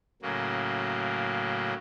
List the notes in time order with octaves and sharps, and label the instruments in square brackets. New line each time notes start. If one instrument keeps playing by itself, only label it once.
[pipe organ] A2 C#3 F#3 A#3